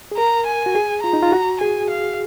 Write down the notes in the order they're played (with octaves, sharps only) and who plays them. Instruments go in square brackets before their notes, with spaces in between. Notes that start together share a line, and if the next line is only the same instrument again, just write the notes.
[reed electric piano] G#4
[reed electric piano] A#4 [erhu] A#5
[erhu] G#5
[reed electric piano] F#4
G#4
[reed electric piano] F4 [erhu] A#5
[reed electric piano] D#4
F4
F#4
[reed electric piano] G#4 [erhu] G#5
[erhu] F5